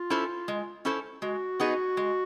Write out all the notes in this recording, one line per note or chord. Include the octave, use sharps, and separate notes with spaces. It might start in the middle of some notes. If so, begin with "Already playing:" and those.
Already playing: F4
C#4 E4 A4 C5
G#3
C#4 E4 A4 C5
G#3 F#4
B3 D#4 G#4
G#3